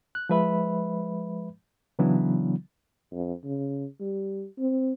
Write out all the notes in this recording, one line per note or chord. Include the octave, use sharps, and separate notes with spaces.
F#6
F3 G#3 B4 E5 B5
C#3 E3 F#3 B3 D4 E4
F2
C#3
G3
C4